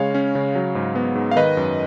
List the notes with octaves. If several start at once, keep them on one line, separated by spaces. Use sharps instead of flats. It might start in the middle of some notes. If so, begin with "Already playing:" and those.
Already playing: C#3 G#3 C#5 F5
C#4
C#3
F#3
G#2
B3
G#2
F5
D#3 B4 D#5
F#2